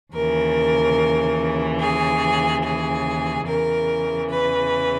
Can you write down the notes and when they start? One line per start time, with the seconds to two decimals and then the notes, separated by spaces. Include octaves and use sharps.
0.13 D#2 C#3 E3 A#4
1.80 G#4
2.64 G#4
3.46 E2 C#3 E3 A#4
4.30 B4